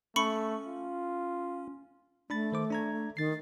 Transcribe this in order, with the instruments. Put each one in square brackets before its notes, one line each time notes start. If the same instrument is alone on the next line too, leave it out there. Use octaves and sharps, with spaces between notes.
[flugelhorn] A3 [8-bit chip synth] C#4 [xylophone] B5 C#6 C#7
[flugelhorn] F4
[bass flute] A3 [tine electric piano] D4 B5 A6
[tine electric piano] D#3 C5 D6
D4 A#5 G#6
[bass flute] D#3 [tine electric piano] A6 C7